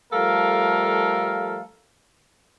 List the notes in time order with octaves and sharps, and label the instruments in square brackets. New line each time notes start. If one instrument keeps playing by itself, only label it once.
[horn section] F3 G3 A3 A4 A#4 F5